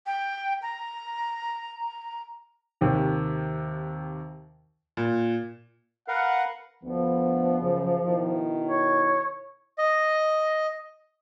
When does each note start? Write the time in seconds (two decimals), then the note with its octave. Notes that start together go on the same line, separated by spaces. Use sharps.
0.06 G5
0.62 A#5
2.81 D#2 C3 D#3
4.97 A#2
6.08 A#4 B4 F5 F#5
6.83 D2 F3 B3
7.61 F#2 C#3
8.06 B2 D#3 E4
8.67 C#5
9.78 D#5